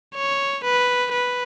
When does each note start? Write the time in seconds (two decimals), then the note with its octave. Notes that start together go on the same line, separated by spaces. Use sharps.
0.16 C#5
0.64 B4
1.12 B4